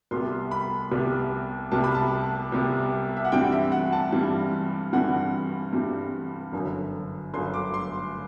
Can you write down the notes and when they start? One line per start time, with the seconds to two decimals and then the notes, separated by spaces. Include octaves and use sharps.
0.11 C2 C3 G3 B3 C6
0.51 B5
0.91 C2 C3 G3 B3
1.71 C2 C3 G3 B3 A5
1.84 B5
1.95 A5
2.52 C2 C3 G3 B3
3.17 E5
3.25 F#5
3.32 G2 E3 G3 C4 G5
3.52 E5
3.72 F#5
3.92 A5
4.12 G2 E3 G3 C4
4.93 G2 E3 G3 C4 F#5
5.73 G2 E3 G3 C4
6.52 G1 F#2 D3
7.34 G1 F#2 D3 C6
7.54 D6
7.74 C6